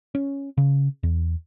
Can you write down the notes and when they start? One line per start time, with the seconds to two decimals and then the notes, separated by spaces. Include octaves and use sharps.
0.15 C#4
0.58 C#3
1.03 E2